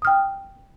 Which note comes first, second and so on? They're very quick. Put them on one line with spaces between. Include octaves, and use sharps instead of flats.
D#6 F6 G5